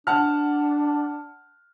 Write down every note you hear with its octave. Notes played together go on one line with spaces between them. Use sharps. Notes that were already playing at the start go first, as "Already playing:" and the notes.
D4 F#5 A5 F6